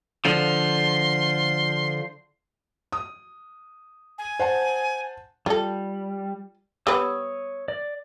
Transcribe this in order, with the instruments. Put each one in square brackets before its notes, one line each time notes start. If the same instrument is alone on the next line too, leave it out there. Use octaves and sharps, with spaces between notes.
[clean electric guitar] D3 F3 [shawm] C6
[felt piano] D#6
[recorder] G#5
[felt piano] C5 F#5 A5
[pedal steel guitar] G3 [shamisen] F4 A4
[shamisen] G3 B3 [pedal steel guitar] C#5 D#6 E6
[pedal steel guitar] D5